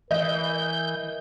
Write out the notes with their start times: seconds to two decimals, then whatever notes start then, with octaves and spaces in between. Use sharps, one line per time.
0.11 E3 A#4 D#5 G6